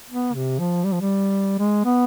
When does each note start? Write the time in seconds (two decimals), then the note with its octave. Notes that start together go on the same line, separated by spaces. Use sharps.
0.10 B3
0.35 C3
0.59 F3
0.84 G3
0.92 F3
1.01 G3
1.59 G#3
1.85 B3